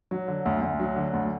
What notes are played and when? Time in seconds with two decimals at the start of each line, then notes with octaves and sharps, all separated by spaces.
0.11 F#3
0.28 D3
0.46 D2
0.62 D2
0.80 F#3
0.96 D3
1.13 D2